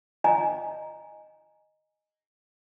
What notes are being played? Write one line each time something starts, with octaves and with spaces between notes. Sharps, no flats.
D#5 G#5 A#5